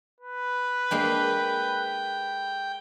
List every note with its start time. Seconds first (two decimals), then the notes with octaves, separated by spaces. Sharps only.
0.20 B4
0.91 G#3 A#3 D4 G5